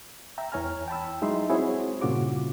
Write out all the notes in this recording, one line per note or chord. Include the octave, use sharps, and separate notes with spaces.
E5 G5 A#5
E2 E3 C#5 G#5 A#5 F6
G5 A5 B5 E6
F#3 G#3 D#4 E4 E5 C6
C4 E4 F#4 G#4 C5 C#5
G2 A#2 C#3 F4 F#4 D6